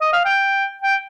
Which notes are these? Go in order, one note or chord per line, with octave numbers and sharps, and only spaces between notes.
D#5
F5
G5
G5